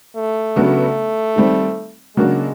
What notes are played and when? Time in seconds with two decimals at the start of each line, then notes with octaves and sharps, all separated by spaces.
0.16 A3
0.56 C#3 F#3 B3 D4 F#4
1.36 D#3 G3 C4
2.16 C#3 F#3 G#3 A#3 D4 F#4